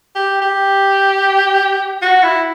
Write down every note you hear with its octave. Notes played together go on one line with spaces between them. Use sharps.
G4
G4
F#4
E4